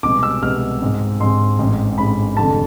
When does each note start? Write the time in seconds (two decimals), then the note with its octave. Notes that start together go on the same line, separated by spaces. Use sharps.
0.03 C2 B2 G#3 B3 D6
0.23 E6
0.42 C2 B2 G#3 B3 F6
0.82 G#2 G#3 C4
1.20 G#2 G#3 C4 C6
1.59 A1 G#2 G#3 C4
1.98 A1 G#2 G#3 C4 B5
2.37 F1 F2 D3 A5